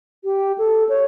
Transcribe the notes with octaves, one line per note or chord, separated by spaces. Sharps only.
G4
A4
C#5